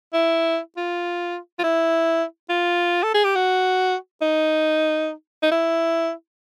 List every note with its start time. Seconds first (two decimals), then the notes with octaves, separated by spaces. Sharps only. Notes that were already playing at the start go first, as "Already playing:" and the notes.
0.13 E4
0.77 F4
1.59 F4
1.63 E4
2.49 F4
3.03 A4
3.14 G#4
3.24 G4
3.35 F#4
4.22 D#4
5.43 D#4
5.51 E4